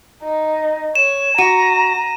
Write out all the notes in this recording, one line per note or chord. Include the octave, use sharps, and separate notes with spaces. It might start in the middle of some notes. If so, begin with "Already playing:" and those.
D#4
C#5 E7
F#4 A#5 D#7